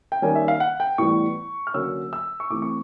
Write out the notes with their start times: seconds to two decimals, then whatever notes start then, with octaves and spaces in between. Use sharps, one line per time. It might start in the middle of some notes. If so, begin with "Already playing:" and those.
0.12 G5
0.22 D#3 G3 A#3 C#4 G#5
0.35 E5
0.48 F5
0.60 F#5
0.80 G5
0.98 A2 E3 G3 B3 C#6
1.67 F6
1.74 D3 F#3 A#3 C#4 E6
2.13 E6
2.40 C#6
2.50 A2 E3 A3 C4 D6
2.62 C#6